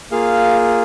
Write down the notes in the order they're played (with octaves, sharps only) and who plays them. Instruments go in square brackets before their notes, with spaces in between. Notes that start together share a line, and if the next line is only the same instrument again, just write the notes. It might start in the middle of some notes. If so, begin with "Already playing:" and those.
[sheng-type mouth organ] A#3 F4 G#4 F5